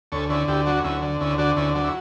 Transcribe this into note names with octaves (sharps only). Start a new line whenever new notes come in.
D2 A4 C#5
D3 C#4 E4
D2 E4 G4
F#3 D4 F#4
D2 C#4 E4
D3
D2 C#4 E4
D3 D4 F#4
D2 C#4 E4
F#3 D4
E4